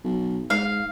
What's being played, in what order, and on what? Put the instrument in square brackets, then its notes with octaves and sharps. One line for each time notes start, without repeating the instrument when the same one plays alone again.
[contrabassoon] B1
[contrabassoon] G#2 [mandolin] F5